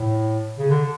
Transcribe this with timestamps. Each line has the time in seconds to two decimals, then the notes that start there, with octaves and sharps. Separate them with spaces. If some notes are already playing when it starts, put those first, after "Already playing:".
Already playing: A2
0.58 C#3
0.70 D3